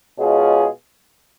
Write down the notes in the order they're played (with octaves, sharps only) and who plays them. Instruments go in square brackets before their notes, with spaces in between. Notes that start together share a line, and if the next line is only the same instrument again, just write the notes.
[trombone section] B2 G#3 C#4 F4 G#4